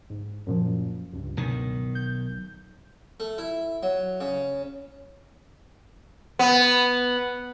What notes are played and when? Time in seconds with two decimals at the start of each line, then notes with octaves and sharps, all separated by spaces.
0.10 G#2
0.47 F#2 A#2 F3
1.13 C#2 G2
1.37 B1 D#3
1.95 G6
3.20 A3
3.38 E4
3.83 F#3
4.20 C#3
6.39 B3